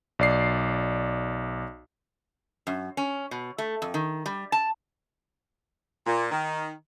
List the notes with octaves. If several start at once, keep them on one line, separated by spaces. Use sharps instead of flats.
B1 D5 C7
F#2
C#4
B2
A3
F2
D#3
G3
A5
A#2
D#3